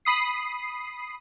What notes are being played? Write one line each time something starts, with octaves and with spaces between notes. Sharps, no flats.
B5 D#6 C7